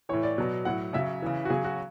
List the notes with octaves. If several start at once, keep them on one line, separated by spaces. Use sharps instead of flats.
A2 E3 C#5
D5
B2 F#3
A2 F#3 F#5
C#3 F#3 E5
C#3 E3
F#4
C#3 F#3 G#4
F#4